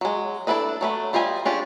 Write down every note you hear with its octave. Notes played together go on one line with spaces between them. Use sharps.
F#3 G#3
D4 E4 A4 B4 D#5
F#3 A3 B4
G3 F4 G4 D#5 G#5
C#4 D4 F4 G4 G#4